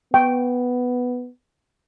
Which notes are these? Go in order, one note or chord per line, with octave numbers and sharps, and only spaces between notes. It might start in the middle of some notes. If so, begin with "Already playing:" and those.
B3 G5